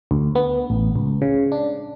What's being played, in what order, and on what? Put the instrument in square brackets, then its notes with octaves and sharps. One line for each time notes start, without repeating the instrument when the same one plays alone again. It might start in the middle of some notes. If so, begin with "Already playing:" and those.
[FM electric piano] D2
B3
A1
C#2
C#3
D4